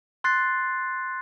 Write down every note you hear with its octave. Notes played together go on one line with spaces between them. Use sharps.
C6 F#6 A6 C7